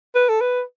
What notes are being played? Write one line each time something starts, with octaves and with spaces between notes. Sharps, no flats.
B4
A4
B4